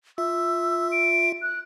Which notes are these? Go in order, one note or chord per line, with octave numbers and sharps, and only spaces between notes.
F4 E5 E6
D7
F#6